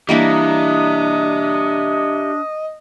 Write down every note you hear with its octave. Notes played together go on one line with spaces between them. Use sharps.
E3 G3 A#3 D4 G4 D#5 E5